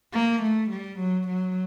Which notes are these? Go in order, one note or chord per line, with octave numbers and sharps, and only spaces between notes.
A#3
A3
G3
F#3
F#3